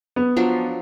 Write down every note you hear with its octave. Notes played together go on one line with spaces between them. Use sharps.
B3
F3 F#3 D4